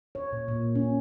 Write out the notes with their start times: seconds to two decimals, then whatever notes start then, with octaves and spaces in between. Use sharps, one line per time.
0.15 C#5
0.33 A#2
0.48 A#2
0.75 C#4